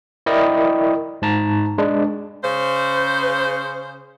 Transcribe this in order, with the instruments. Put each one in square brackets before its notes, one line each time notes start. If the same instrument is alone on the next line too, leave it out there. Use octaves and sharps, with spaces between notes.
[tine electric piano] E4 A#4 D5 D#5 G5
G#2 A5 A#5
G#3 D4
[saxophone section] C#3 C5